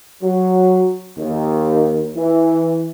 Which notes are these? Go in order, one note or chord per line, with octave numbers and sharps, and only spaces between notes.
F#3
D#2
E3